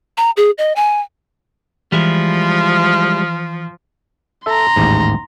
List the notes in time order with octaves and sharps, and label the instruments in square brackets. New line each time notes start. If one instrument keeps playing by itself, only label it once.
[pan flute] A#5
G#4
D#5
G#5
[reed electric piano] E3 [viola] F3 [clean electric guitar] G3 G#3 E4
[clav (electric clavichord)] A4 E5 [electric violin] A#5 C6
[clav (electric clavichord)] A1 D#2 G#2